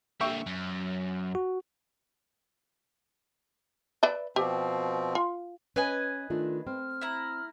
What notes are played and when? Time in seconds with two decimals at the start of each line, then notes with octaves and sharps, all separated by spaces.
0.21 A#2 D3 E5 G5 C#6
0.46 F#2
1.35 F#4
4.03 B4 D5 E5
4.36 B2 F3 C4 G4
5.15 F4
5.76 C#4 B4 D#5 G#5
6.30 D#3 A3 D4 F4
6.67 C4 F6
7.01 E4 A#5